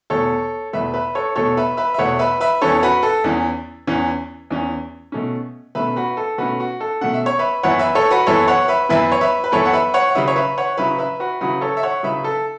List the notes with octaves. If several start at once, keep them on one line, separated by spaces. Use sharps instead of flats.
E2 B2 A3 A4 C#5
E2 B2 A3 B4 E5
B4 E5
A4 C#5
E2 B2 A3 A4 C#5
B4 E5
B4 E5
E5
E2 B2 A3 C#5 F#5
B4 E5
B4 E5
E2 E3 C#4 A4 C#5
F#4 B4
A4
E2 E3 C#4
E2 E3 C#4
E2 E3 C#4
B2 A3 C#4
B2 A3 C#4 B4 E5
F#4 B4
A4
B2 A3 C#4 F#4 B4
F#4
A4
B2 A3 C#4 F#5
E5
C#5
B4 E5
F#2 E3 B3 E4 C#5 F#5
B4 E5
A4 C#5
F#4 B4
F#2 E3 B3 E4 A4 C#5
C#5 F#5
B4 E5
F#2 E3 B3 E4 B4 E5
C#5
B4 E5
B4
F#2 E3 B3 E4 A4 C#5
F#5
B4 E5
C#5 F#5
F#5
C#3 F#3 C#4 E4 B4 E5
C#5
B4 E5
C#5 F#5
C#3 F#3 C#4 E4 B4 E5
B4 E5
F#4 B4
C#3 F#3 C#4 E4 F#4 B4
A4 C#5
E5
C#5 F#5
C#3 F#3 C#4 E4 B4 E5
A4